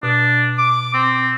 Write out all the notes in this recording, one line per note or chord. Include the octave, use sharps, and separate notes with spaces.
B2 D4
D6
C4